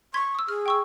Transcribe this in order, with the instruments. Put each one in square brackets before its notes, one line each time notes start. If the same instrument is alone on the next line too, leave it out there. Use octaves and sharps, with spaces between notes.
[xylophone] C6 G#6 B6 [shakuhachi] C#6
[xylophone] D#6 E6
[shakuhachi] G#4 [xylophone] F6
[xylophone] G5 C#6 E6